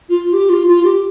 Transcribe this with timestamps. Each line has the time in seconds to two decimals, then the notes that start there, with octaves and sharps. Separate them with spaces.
0.10 F4
0.33 G4
0.50 F4
0.67 F4
0.84 G4